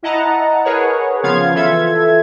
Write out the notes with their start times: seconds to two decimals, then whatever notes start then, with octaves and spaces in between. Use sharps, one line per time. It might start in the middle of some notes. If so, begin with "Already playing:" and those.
0.03 E4 D#5 F#5 A5 A#5
0.64 G#4 A#4 B4 C#5 F#5
1.23 C#3 F3 B3 F4 F5 G#6
1.54 E3 F4 A4 E5 G#6